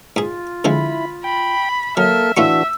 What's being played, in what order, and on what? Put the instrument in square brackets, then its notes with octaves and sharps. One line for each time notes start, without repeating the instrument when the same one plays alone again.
[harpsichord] G#2 G#4 [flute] F4
[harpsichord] D3 F3 G#3 [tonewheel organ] E4 [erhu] B5
[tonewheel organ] G5 [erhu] B5
[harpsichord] F#3 [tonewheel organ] A#3 A4 [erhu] E5 [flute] F6
[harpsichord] A2 F4 C#6 [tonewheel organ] E3 D4 F#4 [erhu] E5 [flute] E6